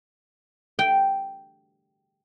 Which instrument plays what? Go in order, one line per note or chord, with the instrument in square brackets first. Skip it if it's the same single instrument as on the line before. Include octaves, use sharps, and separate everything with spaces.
[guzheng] G5